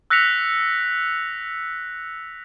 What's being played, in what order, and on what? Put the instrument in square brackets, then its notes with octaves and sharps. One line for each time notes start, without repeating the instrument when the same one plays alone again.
[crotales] E6 F#6 A#6 B6 C#7 F7